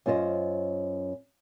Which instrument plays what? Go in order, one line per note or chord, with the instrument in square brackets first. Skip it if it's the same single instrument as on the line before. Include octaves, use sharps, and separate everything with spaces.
[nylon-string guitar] F#2 C#4 F4 C5 D#5